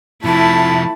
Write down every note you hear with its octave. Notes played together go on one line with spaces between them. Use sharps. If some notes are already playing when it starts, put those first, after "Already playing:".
C3 F3 A3 E4 A5 B5